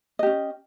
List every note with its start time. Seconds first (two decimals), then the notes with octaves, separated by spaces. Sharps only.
0.19 D#5
0.23 G4
0.26 C#4